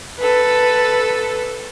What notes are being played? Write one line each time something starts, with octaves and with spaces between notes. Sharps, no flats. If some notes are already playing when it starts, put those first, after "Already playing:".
A4 B4